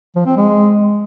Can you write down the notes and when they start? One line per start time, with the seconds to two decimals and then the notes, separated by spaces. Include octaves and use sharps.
0.16 F3
0.26 C4
0.37 G#3